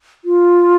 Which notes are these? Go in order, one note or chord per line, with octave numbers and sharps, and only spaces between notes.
F4